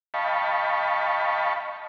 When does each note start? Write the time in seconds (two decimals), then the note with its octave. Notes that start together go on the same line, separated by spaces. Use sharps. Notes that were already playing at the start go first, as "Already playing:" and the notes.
0.14 D#5 F5 G5 A5 B5 C#6